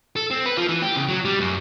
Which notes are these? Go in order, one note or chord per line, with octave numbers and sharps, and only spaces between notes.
A4
C4
B4
F3
E3
G4
C#3
F#3
G3
F#2